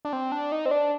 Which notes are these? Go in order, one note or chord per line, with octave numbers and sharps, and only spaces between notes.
D4
C4
D4
D#4
C4
D4